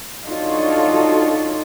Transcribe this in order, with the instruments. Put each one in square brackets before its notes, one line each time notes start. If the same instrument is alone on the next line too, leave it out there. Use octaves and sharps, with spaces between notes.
[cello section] D4 D#4 F4 F#4 A4 C#5